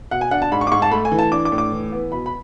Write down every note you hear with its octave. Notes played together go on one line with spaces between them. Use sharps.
B2 F#5
G#5
D4 F#5
A5
G#2 B5
C#6
D6
G#2 C#6
A5
A3 B5
G#5
E3
A5
D4 D6
D6
A2
D6
E3
B3
B2 B5
B5